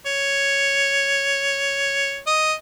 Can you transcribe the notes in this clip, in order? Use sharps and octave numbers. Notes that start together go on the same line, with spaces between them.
C#5
D#5